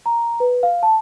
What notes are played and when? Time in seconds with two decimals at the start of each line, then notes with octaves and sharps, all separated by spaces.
0.06 A#5
0.40 B4
0.63 F5
0.83 A5